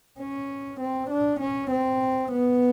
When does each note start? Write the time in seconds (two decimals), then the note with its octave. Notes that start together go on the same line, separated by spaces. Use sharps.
0.19 C#4
0.80 C4
1.10 D4
1.40 C#4
1.71 C4
2.32 B3